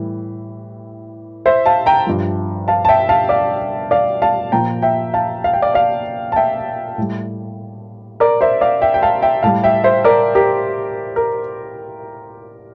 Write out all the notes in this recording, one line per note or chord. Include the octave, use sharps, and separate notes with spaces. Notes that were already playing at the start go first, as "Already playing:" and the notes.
Already playing: A2 E3 G3
C5 E5
F5 A5
G5 A#5
G2 F3
F5 A5
A5
E5 G5
F5 A5
D5 F5
D5 F5
F5 A5
A#2 F3 G5 A#5
E5 G5
F5 A5
F5
G5
D5 F5
D5 F5
A5
E5 G5
A2 G3
A#4 D5
C5 E5
D5 F5
E5 G5
G5
F5 A5
E5 G5
A2 G3 F5 A5
E5 G5
C5 E5
A#4 D5
G4 A#4
A#4